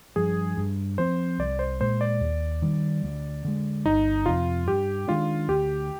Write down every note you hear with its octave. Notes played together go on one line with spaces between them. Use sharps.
G2 F3 G#4
G2
F3 C4 C5
C2 D5
C5
A#2 G#3 C5
D5
D#2
D#3 G3
D2
D3 G#3
G1 D#4
F2 C3 F4
G2 G4
D#3 G#3 D4 F4
D2 G4